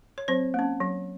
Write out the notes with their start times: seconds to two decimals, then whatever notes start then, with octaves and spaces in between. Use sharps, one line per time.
0.18 C#5
0.28 F#3 C4 C5
0.54 A#3 C#4
0.81 F#3